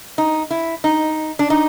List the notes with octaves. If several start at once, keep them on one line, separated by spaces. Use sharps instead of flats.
D#4
E4
D#4
D4
D#4